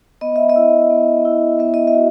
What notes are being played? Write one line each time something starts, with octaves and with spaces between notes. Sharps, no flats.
B3 D#5
E5
D#5
E4
B3
E4
B3 E5
D#5
E5
F#4